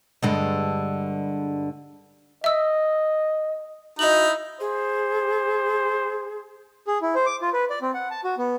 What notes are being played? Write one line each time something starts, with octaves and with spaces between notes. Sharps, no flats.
G2 D3 G#3
D#5 E5 E6
D#4 E4 F#4 D#5 F#7
G#4 C5
G#4
E4
C5
D6
F4
B4
D5
C4
F#5
A5
F#4
B3